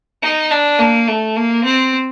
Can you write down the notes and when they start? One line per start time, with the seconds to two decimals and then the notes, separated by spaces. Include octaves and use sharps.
0.23 D#4
0.51 D4
0.79 A#3
1.07 A3
1.36 A#3
1.64 C4